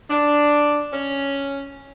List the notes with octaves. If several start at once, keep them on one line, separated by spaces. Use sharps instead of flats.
D4
C#4